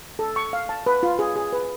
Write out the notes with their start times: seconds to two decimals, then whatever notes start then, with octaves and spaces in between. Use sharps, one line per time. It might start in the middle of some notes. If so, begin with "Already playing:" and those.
0.19 A4
0.36 C#6
0.53 F5
0.69 A5
0.86 B4
1.03 F4
1.19 G#4
1.36 G#4
1.53 B4